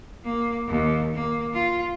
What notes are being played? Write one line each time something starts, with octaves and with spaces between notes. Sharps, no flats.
A#3
D#2
A#3
F4